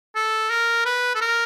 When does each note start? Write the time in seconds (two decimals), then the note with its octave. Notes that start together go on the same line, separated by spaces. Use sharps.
0.15 A4
0.50 A#4
0.85 B4
1.15 A4
1.21 A#4